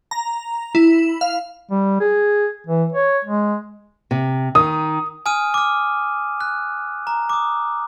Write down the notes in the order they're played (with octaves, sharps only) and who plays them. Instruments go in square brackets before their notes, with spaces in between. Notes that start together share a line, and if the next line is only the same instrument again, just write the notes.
[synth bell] A#5
E4
F5
[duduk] G3
G#4
E3
C#5
G#3
[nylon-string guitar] C3
[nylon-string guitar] D#3 [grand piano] D#6
[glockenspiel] G#5 D#6 F6 D#7
D6 F6
F#6
A#5
D6 D#6